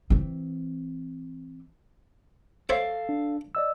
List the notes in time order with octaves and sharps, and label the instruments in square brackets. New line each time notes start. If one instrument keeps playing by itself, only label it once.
[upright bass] E3 C4
[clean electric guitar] A4 F5 [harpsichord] C5 C#5 E5
[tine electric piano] D4
D5 D#5 E6